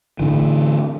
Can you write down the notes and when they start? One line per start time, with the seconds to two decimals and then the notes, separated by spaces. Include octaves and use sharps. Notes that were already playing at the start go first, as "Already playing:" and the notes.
0.20 A2 D3 E3